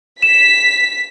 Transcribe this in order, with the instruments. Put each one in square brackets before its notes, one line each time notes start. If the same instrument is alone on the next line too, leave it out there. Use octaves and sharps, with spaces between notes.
[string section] B6 [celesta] E7